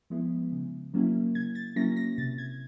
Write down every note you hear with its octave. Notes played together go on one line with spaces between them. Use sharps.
F3 G#3 B3 E4
C#3
F#3 A#3 C#4 E4
C#3 G#6
A6
F#3 A#3 C#4 E4 A#6
A#6
C3 A6
G#6